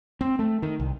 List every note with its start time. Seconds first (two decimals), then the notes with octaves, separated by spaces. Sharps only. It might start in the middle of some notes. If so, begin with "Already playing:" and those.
0.21 C4
0.39 A3
0.62 D#3
0.80 C2